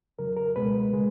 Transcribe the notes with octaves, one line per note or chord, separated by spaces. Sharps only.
F2 C#3 F#3 A#4
A#4
C#2 B2 G#3 B4
C#3 G#3